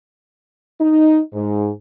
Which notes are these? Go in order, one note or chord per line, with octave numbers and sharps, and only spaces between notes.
D#4
G#2